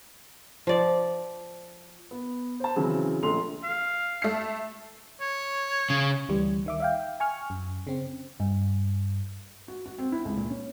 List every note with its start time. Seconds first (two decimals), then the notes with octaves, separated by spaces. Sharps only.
0.67 F3 D5
2.11 B3
2.60 C5 A5
2.76 C#3 E3 F#3 C4 E4
3.23 A#1 A3 C6 F7
3.64 F5
4.22 A3 C7
5.21 C#5
5.90 C#3
6.29 D2 E3 G3 G4
6.66 D#3 E5 D6
6.80 E5 F5 G5
7.20 G#5 C#6 F6
7.50 F#2
7.87 C#3 C4
8.40 G2
9.68 F#4
9.86 F#4
9.98 C4
10.12 E4
10.25 C#2
10.37 A#2
10.50 C#4